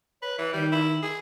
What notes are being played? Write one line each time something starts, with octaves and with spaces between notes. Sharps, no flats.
B4 C#5
E3
D#3 G3
E4
G#4